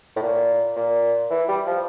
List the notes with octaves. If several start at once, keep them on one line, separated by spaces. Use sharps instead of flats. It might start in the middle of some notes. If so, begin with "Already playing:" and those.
A2
A#2
A#2
E3
G3
F3